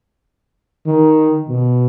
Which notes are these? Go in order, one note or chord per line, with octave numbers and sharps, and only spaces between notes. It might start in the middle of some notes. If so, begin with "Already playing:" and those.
D#3
B2